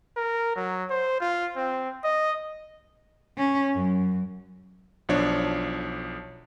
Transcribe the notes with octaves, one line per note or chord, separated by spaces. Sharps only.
A#4
F#3
C5
F4
C4
D#5
C#4
F#2
B1 F3 D4 C#5